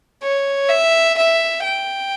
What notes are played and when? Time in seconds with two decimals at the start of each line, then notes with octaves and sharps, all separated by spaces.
0.23 C#5
0.69 E5
1.17 E5
1.64 G5